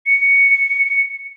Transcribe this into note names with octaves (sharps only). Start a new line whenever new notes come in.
C#7